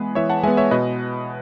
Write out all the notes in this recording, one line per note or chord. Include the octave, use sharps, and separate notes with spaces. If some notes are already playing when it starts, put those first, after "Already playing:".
Already playing: E3 G#3 B3 G#4 B4
E3 C#5 E5
F#5 A5
G#3 B3 E5 G#5
C#5 E5
B2 B4 D#5